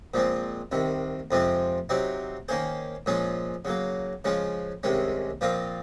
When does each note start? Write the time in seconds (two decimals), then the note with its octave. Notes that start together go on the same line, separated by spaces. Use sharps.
0.14 A#2 F3 G#3 C4
0.72 C2 C3 D#3
1.31 F2 C3 F3 G#3 C4
1.89 C3 F#3 C4 D#4
2.49 D#3 A#3 C#4 G#4 C5
3.06 A#2 F3 G#3 C#4 G#4
3.65 C#3 F#3 A#3
4.25 C#3 F3 G#3 C#4 G#4
4.83 C2 C3 D#3 G#3 C#4
5.41 A#2 F3 C4 F4 A#4